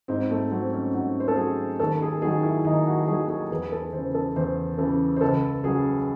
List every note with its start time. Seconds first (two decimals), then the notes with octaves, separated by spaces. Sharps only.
0.08 G#2 C4
0.30 A3
0.51 F#3 C4
0.72 C#4
0.94 G#2 F#4
1.20 C5
1.28 A4
1.36 F#3 G#4
1.80 D#2 A4
2.01 G#4
2.22 D#3 F#3 G#4
2.43 E4
2.65 D#2 D#4
2.87 F#4
3.08 D#3 F#3 G#4
3.29 G#4
3.51 E2 G#4
3.72 A4
3.93 C#3 E3 C5
4.15 A4
4.36 E2 C5
4.78 C#3 E3 A4
5.16 C5
5.21 C#2 A4
5.64 C#3 F#3 G#4